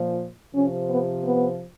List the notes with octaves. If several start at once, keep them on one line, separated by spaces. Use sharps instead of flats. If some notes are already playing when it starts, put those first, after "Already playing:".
Already playing: A#2 F3
C3 F3 C#4
B3
B3